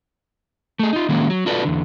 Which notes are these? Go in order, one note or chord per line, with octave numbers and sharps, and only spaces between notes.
A3 G#4
D#4 F4
D#3 F#3 G#3 A#3 C#4
F#3
F4 F#4 A4 B4 D5
E2 D3